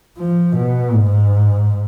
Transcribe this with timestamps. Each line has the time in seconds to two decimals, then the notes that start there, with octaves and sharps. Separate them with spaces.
0.19 F3
0.57 B2
0.94 G#2